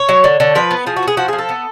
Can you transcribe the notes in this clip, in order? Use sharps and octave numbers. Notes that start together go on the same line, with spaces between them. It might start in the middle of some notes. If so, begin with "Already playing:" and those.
Already playing: C#5
F#3
D3
D3
F3 B4
B3
F3 G#4
F#4
B3
G#4
F3 F#4
F3 G#4
A4
B3